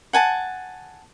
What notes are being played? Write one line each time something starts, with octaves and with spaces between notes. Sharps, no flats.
F#5 G#5 A5